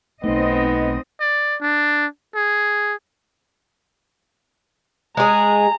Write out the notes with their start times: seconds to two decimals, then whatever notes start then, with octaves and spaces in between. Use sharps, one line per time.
0.24 B1 A3 B3 C4 D#4 D#5
1.21 D5
1.61 D4
2.35 G#4
5.17 G#3 G#4 A#5